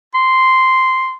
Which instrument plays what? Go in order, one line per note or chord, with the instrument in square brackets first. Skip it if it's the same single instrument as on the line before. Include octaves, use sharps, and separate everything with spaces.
[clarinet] C6